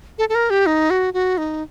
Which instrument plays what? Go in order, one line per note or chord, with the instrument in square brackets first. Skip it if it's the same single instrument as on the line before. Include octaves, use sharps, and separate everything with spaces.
[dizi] A4
A4
A#4
G4
D#4
F#4
F#4
D#4